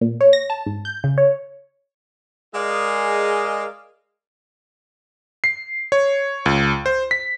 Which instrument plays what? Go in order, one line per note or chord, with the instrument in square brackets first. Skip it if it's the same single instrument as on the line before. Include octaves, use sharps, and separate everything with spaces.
[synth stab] A#2
C#5
A#6
A5
G#2
G6
C#3
C#5
[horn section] G#3 G#4 A#4 D5 D#5 F5
[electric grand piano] C7
C#5
C#2
C5
B6